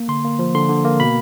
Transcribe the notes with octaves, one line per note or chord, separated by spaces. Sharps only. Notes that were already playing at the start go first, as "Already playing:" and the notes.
Already playing: A#3
D3 C6
A#3
F3
D3 C6
D3
A#3
B2 B5